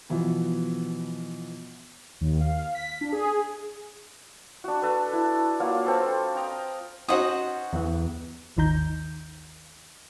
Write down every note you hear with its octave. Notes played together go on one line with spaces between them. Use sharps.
B2 E3 F3 B3
D#2
F5
B6
D4
G#4
D4 F#4
A4 B4
E4
F#3 A#3 F4 F#4
C4 A4 B4
G5 A#5 D#6
C#4 D#4 F#4 C5 F#5 D#6
E2 E3
G#1 D#2 D#3 D#4 A#5 G6